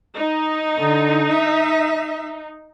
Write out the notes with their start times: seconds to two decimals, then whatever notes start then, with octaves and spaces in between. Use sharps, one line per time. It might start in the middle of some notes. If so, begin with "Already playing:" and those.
0.16 D#4
0.78 D3
1.33 E5